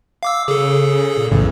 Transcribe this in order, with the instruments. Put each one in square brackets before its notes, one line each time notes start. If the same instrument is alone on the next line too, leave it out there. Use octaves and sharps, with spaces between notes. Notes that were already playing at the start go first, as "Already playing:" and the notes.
[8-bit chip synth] F5 D6 E6
[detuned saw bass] C#3 [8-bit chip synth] G#4 A4
[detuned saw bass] A#2
[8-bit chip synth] B1 [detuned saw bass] E2 [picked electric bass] A2 C#3 E3